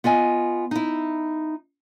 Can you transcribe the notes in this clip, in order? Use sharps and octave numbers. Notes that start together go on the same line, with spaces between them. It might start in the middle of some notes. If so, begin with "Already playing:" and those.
B3 F4 D#5 G#5
D#4 E4